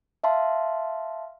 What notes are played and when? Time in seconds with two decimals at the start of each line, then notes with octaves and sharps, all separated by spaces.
0.24 E5 F5 A5 C6